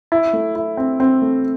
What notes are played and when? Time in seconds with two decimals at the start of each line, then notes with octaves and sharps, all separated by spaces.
0.12 E4
0.33 A3
0.56 E4
0.77 C4
1.00 C4
1.22 A3